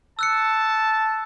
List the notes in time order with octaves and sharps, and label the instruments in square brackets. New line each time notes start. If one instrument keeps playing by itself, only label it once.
[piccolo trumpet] A5 [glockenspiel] E6 F#6 C#7